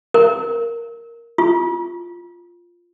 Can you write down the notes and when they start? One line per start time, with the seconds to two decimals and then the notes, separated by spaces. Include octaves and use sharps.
0.14 A#4
1.38 F4